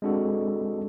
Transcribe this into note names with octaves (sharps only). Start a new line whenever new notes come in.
G#3 C4 D4 F#4 A4